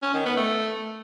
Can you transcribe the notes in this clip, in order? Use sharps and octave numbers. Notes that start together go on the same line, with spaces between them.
C#4
D#3
B3
A3